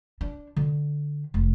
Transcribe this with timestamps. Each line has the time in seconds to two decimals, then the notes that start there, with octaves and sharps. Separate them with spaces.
0.21 D4
0.56 D3
1.34 F1